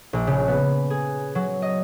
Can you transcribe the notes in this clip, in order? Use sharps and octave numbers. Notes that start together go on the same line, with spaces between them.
A#1
C#3
B3
G#4
F#3
D#5